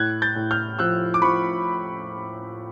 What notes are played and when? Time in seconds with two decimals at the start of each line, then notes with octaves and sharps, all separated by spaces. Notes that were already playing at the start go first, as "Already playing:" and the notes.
Already playing: A2 F#6 G#6
0.22 G6 A6
0.36 A2
0.51 F6 G6
0.79 F3 E6 F#6
1.14 D6
1.22 F3 B5 C#6